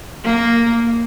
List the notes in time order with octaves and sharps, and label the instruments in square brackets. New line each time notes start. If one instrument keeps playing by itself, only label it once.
[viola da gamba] A#3